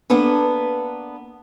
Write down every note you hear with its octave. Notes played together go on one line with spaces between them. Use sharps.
A#3 B3 D4 A4 B4